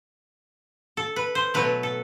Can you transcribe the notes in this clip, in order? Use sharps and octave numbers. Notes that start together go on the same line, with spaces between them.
A4
B4
C5
B2 F#3 A3 B4
A4